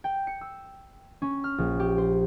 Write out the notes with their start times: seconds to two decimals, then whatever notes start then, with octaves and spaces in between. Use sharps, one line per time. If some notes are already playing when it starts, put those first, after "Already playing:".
0.04 G5
0.27 C#7
0.41 E6
1.22 C#4
1.44 F6
1.58 A#1
1.80 G4
1.98 C5